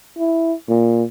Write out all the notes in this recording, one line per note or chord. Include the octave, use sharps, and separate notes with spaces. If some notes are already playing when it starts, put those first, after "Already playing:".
E4
A#2